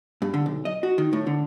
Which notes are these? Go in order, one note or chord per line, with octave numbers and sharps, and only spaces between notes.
G2
D3
B1
D#5
F#4
D#3
A2
D3